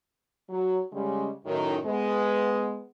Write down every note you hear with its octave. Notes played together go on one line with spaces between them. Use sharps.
F#3
C#3 G3 G#3
F#2 A2 D#3
G#3 B3